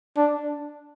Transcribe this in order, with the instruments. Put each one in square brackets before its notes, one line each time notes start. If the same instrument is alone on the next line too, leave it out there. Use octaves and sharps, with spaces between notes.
[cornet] D4